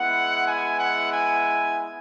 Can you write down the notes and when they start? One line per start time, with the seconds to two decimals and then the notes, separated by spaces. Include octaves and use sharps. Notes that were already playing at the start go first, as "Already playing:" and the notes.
Already playing: G#3 B3 E4 F#5
0.47 G#5
0.79 F#5
1.12 G#5